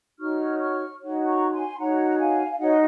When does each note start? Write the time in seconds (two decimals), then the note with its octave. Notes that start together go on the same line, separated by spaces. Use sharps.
0.19 D#4 F#4 C#5 C#6 F6
0.58 C#6 F6
0.99 D#4 F#4 C#5
1.25 A#5 C#6
1.51 G#5 C6
1.78 D#4 F#4 C#5 F#5 A#5
2.10 A#5
2.18 F5 G#5
2.50 F5
2.58 D#4 F#4 C#5 D#5 F#5